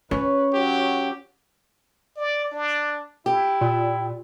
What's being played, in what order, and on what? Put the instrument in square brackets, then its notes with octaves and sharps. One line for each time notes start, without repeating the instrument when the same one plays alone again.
[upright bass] C#4 [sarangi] B4 [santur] C#5
[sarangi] F#3 [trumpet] G4
[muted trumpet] D5
D4
[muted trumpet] E4 [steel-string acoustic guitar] G4
[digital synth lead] A#2